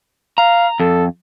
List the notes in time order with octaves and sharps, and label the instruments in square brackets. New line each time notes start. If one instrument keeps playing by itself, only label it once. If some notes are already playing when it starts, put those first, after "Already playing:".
[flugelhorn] F5 [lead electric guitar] A#5
[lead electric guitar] F2 [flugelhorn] A4